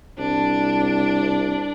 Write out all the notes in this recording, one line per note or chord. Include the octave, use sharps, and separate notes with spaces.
C2 D4